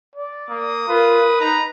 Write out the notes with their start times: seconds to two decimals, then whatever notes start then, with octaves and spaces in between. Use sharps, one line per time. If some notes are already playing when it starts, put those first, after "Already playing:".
0.15 D5
0.49 A#3 D#6
0.89 F4 A#4 B4
1.41 D#4 A#5